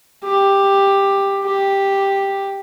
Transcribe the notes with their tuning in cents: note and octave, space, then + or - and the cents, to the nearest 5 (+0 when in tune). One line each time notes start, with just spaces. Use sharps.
G4 +10
G4 +5